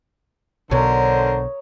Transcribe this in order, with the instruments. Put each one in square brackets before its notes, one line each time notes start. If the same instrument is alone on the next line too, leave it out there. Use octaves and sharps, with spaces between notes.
[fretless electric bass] B1 B2 [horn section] D3 C5 [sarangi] A#4 [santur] C#5 D#6